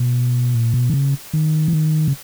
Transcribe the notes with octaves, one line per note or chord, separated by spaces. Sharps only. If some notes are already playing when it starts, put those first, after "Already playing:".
Already playing: B2
A#2
B2
D#3
C#3
D#3
E3
D#3
C#3